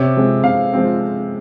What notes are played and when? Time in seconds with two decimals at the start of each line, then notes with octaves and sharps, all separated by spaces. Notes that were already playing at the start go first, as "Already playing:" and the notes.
Already playing: C3 C#5
0.16 F3 G#3 C4
0.43 C3 F5
0.73 F3 G#3 C4